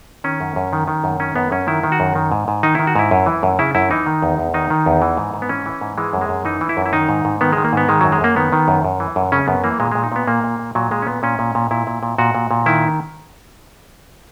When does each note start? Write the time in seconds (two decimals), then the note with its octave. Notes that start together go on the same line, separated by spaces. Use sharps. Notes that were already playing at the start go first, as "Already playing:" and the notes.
0.24 D#3 C#4
0.41 F#2
0.56 F#2
0.73 D#3
0.88 D#3
1.04 F#2
1.20 D#3 C#4
1.36 F#2 B3
1.52 F#2 C#4
1.67 D#3 E4
1.84 D#3
1.92 F#4
2.00 F#2
2.15 D#3
2.32 G#2
2.48 G#2
2.63 D#3 D#4
2.75 D#3 E4
2.87 F#4
2.96 G#2 E4
3.11 F#2
3.26 E3
3.43 F#2
3.59 C#3 E4
3.75 F#2 E4
3.91 E3 D#4
4.06 D#3
4.22 E2
4.38 E2
4.54 D#3 D#4
4.70 D#3
4.86 E2
5.02 E3
5.17 G#2
5.34 G#2
5.42 B3
5.49 E3 C#4
5.66 E3
5.81 G#2
5.98 E3 G#3
6.13 F#2
6.21 G#3
6.29 F#2
6.45 E3 D#4
6.61 E3
6.69 E4
6.77 F#2
6.86 E4
6.93 D#3 D#4
7.09 G#2
7.25 G#2
7.41 D#3 B3
7.53 D#3 G#3
7.64 A#3
7.73 G#2 B3
7.89 D#3 G#3
8.01 F#2 F#3
8.12 G#3
8.21 F#2 A#3
8.36 D#3 B3
8.52 D#3
8.68 F#2
8.85 F#2
9.00 E3
9.16 F#2
9.32 C#3 C#4
9.48 F#2 B3
9.64 E3 A#3
9.80 A#2 G#3
9.92 A#2 G#3
10.04 D#4
10.12 A#2 B3
10.27 A#2 A#3
10.44 A#2
10.59 A#2
10.75 A#2 F#3
10.91 A#2 G#3
11.02 C#4
11.07 A#2 B3
11.23 A#2 C#4
11.39 A#2
11.55 A#2
11.71 A#2 E4
11.87 A#2
12.03 A#2
12.18 A#2 F#4
12.35 A#2
12.51 A#2
12.66 D#3 E4